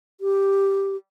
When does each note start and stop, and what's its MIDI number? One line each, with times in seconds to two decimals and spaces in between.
0.21 0.96 67